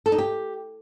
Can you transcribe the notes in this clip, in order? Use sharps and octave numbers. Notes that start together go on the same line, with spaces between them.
A4
D#4
G4